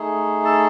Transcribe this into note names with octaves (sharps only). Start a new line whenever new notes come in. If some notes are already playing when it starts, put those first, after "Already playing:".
Already playing: A3 D#4 G#4
A4 A5